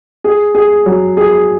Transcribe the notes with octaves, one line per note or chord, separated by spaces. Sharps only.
G#4
G#4
F#3
G#4